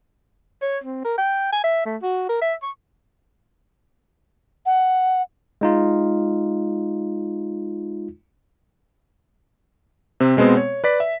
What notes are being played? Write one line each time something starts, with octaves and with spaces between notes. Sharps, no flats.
C#5
C4
A#4
G5
G#5
E5
A3
F#4
A#4
E5
C#6
F#5
G#3 D#4 F4
C3 C4
B2 G#3 B3 C4
C#5
B4 D5 B6
E5